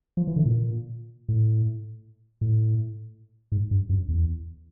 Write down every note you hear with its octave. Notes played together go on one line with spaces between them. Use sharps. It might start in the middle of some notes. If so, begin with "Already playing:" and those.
F3
E3
D3
A#2
A2
A2
G#2
G2
F#2
E2